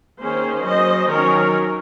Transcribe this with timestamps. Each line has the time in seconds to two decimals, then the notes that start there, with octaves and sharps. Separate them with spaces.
0.21 D#3 A#3 C#4 G#4 C5
0.65 F#3 C#4 C5 D#5
1.09 D#3 F#3 C#4 A#4 C#5